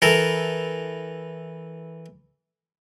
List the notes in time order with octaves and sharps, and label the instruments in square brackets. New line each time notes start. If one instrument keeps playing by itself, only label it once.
[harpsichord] E3 A4 A#4